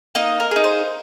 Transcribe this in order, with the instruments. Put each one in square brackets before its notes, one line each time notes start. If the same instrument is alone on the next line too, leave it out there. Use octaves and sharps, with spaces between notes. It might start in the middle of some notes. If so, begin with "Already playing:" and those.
[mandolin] A#3 D#4 D#5
A#4
D#4 G#4
C5